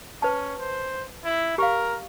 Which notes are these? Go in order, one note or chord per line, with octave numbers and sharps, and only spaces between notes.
C#4 B4 A5
C5
E4
G4 A#4 F5